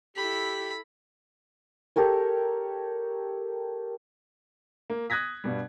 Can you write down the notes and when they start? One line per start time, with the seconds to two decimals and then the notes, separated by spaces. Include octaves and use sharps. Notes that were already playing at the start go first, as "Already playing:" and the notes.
0.17 E4 G4 A4 B5
1.96 G4 A4 A#4 C#5
4.90 A#3
5.10 D#6 F#6 G#6 A#6 B6
5.44 G2 B2 G3